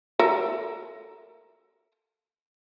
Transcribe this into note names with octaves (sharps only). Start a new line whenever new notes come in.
A4 A#4 E5